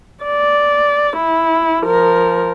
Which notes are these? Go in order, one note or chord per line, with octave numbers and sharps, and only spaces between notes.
D5
E4
F3 A#4